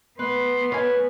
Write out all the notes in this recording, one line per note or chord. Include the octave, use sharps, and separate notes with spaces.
B3 B4 C6
C#4 B4 G#5